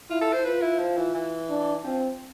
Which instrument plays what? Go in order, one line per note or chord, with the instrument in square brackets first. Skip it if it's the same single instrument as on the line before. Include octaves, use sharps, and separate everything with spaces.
[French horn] E4 [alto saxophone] F4
[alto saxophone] A4
C5
[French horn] F4 [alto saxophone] B4
[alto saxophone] E4
F3
E3
E3
[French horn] D4
[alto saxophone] F3 [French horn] C4